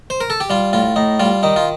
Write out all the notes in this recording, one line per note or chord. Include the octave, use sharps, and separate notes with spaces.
C5
A#4
A4
G4
G3 F4
A2 F4
A2 D#4
G3 F4
D#3 D#4
F4